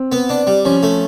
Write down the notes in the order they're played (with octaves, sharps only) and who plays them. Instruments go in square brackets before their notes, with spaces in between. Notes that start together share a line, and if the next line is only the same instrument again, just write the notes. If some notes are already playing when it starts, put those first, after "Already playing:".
Already playing: [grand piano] C4
[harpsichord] B3
D4
G3
[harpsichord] F3 [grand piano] C#4
[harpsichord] A3